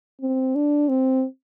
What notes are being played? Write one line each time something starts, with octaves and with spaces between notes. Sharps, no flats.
C4
D4
C4